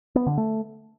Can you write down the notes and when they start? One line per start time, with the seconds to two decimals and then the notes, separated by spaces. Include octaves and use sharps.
0.15 B3
0.27 D3
0.38 A3